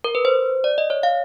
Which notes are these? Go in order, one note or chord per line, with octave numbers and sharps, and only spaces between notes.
A#4
B4
C5
D5
D#5
C#5
F5